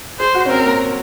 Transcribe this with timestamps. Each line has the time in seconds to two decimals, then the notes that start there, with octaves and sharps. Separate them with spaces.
0.19 G#4 C5
0.35 F#4
0.46 C#4
0.49 C4 A#4
0.65 A#3